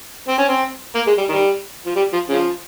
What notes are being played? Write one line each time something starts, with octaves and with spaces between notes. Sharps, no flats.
C4
C#4
C4
A#3
G#3
G3
D#3 G3
F3
G3
F3
C#3 F3